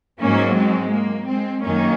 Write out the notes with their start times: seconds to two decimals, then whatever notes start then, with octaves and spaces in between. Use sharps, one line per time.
0.20 G#2 F#3 A#3 C#4
0.56 G#3 C4
0.92 A#3
1.28 G#3 C4
1.64 F#2 D#3 A#3 C#4